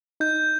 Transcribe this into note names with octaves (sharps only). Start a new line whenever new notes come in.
D#4 G6